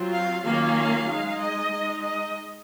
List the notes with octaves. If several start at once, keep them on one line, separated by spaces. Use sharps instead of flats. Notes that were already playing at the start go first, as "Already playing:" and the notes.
Already playing: F#3 C4 F4
F5
D#3 F#3 A#3 C#4 F4 F5
G#3 D#4
D#5
G#3 D#4
D#5